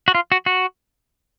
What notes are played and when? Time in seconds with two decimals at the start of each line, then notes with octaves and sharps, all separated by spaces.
0.08 F#4
0.15 F4
0.32 F#4
0.46 F#4